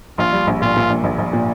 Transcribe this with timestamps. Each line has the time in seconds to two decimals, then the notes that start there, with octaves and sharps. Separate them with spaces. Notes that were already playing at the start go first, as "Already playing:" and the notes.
0.18 A#1 F4
0.32 G3
0.47 A#1
0.62 A#2 F4
0.76 A#2
0.90 A#1
1.04 A#1
1.18 A#1
1.33 A#2